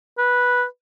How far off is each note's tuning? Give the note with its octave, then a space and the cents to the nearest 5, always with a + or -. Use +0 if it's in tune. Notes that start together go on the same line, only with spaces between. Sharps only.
B4 -10